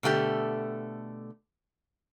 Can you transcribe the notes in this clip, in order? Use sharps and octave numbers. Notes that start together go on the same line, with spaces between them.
B2 D3 A3 G4